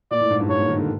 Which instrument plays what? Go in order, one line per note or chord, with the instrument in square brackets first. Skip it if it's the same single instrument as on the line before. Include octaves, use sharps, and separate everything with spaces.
[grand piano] A#2 [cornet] D5
[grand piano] A2
G#2
G2
[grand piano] G#2 [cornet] C#5
[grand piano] A#2
D#3
D3